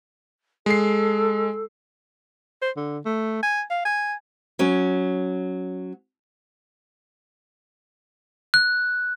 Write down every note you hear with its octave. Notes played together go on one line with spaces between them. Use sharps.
G#3 A4 C7
C5
D3
A3
G#5
F5
G#5
F#3 C#4
F#6